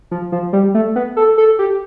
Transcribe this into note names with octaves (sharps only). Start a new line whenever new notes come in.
F3
F3
G3
A3
B3
A4
A4
G4